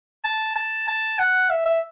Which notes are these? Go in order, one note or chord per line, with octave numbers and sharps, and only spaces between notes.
A5
A5
A5
F#5
E5
E5